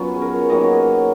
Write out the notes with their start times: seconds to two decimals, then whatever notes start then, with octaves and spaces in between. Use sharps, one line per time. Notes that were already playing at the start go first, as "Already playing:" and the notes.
Already playing: F#3 B3 C#4 F4
0.14 G#4
0.22 A#4
0.36 C#5
0.50 D#3 F#3 A#3 D#5
0.64 C#5